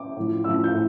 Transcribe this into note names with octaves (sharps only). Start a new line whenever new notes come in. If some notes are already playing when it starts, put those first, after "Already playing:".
Already playing: D6
A2 F3
A2 F3 E6
G6
A2